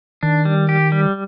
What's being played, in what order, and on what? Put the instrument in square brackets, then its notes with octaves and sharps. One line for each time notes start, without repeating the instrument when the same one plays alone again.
[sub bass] D#3 [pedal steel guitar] D4
[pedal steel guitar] G3
G4
G3